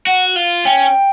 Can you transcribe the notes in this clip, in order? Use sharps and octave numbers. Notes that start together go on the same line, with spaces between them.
F#4 F#5
F4
C#4 G5